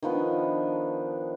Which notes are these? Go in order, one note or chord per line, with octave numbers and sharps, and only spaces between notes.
D#3 F3 B3 D4